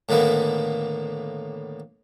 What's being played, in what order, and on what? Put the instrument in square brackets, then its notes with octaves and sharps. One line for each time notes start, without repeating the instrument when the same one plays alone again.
[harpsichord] A2 D3 D#3 A#3 B3